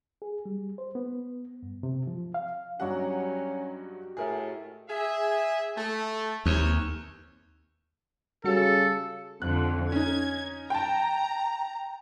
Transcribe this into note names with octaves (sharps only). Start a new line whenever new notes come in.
G#4
G3
C5
B3
G2
C3
F3
F5
G2 F#3 C#4 D#4 F#4 G4 F#5
A2 G#4 A#4 E5
G#4 E5
A3
D#2 C3 E3 C#5
C#3 G3 F#4 A4 C#7
F2 D3 F#6
C#4 D#4 G#6
G5 A5 A#5